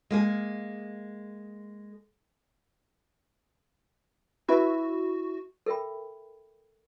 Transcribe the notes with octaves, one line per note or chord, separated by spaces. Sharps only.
G#3 A#3 G#4
E4 F#4 B4 E5
A4 A#4 E5 G5 B5